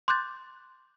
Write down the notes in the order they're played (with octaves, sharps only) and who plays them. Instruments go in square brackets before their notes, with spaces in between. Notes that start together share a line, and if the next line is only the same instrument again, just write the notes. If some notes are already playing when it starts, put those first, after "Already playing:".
[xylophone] C6 D6 F#6 G6 A6